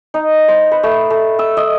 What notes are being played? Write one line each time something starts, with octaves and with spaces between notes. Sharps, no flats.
D#4
C5
B4
A3
A3
E6
D#5